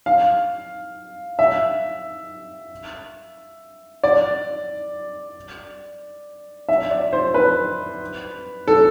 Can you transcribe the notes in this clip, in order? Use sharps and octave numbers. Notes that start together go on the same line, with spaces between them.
F5
E5
D5
E5
D5
C5
B4
A4